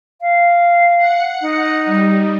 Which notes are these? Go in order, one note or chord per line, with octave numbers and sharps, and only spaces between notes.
F5
F#5 C#7
D#4
G3